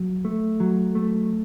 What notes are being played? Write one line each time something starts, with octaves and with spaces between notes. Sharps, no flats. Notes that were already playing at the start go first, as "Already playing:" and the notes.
Already playing: F#3
A3
F#3
A3